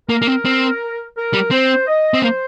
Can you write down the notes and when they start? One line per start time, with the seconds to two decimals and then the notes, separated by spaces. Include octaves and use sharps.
0.09 A#3 A#4
0.22 A#3
0.27 C4
0.45 C4
1.16 A#4
1.33 G3
1.51 C4 C5
1.87 D#5
2.14 C4
2.22 A#3 C5